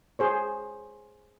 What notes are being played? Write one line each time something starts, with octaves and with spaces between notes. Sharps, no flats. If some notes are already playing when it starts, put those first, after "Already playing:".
G#4 C5 C#5